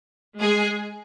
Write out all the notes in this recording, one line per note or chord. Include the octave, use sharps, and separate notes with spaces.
G#3 G#4